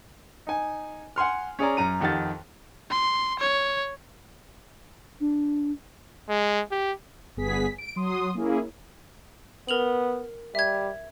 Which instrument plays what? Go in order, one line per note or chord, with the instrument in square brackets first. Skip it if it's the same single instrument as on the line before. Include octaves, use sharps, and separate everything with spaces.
[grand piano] D#4 G#5
F#5 G#5 C6 F6
C#4 G#4 D5 A#5
F#2 A#5 D#7
F2 D#3 G4 F#5 A6
[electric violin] C6
C#5
[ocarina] D4
[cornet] G#3
G4
[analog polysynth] G1 G2 B3 G#4 B6
D7
F#3 C6 D#6
A#3 C#4 E4 G#4
[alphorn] B3 [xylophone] A#4 F7 F#7
[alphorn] G3 [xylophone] E5 G#6